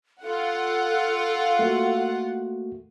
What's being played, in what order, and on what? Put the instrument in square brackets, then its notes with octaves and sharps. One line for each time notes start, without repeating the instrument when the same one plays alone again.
[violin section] F4 F#5 [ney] A4
[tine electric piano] A3 A#3 F#4